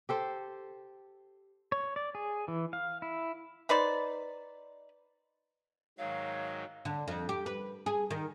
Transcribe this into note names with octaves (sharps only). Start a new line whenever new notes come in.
G4 A4 C5
C#5
D5
G#4
E3
F5
E4
D#4 B4 C5 D5
G#2 D#3 F#3 C#5 F5
D3
F2
G4
B4
G#4
D#3